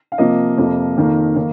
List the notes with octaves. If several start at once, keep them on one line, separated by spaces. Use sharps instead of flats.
F5
C3 F3 A#3 D#5
F2 C3 F3 A#3
F2 D#3 A#3
D#3 A#3